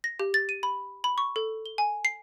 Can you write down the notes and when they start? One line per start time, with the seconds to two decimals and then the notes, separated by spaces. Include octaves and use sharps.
0.04 A#6
0.20 G4
0.34 A6
0.49 D#7
0.63 B5
1.04 B5
1.18 C#6
1.36 A4
1.66 G7
1.78 G#5
2.05 C7